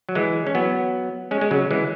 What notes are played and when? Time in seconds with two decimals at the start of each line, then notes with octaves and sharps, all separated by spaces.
0.09 F#3
0.15 E3 G#3
0.47 C#4
0.55 F#3 B3
1.31 G#3 C#4
1.41 G#3
1.51 C#3 F#3
1.71 E3 G#3